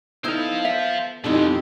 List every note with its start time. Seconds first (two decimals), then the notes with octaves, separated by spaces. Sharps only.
0.24 B3 D#4 E4 A4 C5 F5
0.65 E5
1.24 F2 B2 G#3 C4 D#4 E4 G4 A4